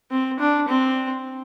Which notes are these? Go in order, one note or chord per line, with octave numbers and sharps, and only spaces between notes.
C4
D4
C4